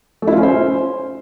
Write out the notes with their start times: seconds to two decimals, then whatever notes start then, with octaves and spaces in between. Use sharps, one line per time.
0.22 A3
0.27 E4
0.33 F4
0.38 C#4
0.43 C5